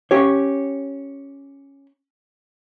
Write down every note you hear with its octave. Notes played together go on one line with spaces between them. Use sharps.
C#4 G4 C#5